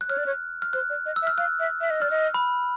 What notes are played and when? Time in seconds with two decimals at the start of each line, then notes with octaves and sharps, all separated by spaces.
0.01 F#6
0.09 C#5 F6
0.18 D5
0.26 C#5
0.62 F6
0.73 C5 F#6
0.90 D5
1.06 D#5
1.16 E6
1.22 E5
1.27 F6
1.38 F5 F#6
1.60 E5
1.81 E5
1.90 D#5
2.01 D5 F6
2.11 D#5
2.34 B5